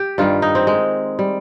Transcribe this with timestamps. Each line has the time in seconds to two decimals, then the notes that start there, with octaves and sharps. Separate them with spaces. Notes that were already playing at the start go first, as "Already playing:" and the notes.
Already playing: G4
0.18 G2 D#3 G3 F4
0.42 D#4
0.55 C4
0.67 G#3
1.19 G3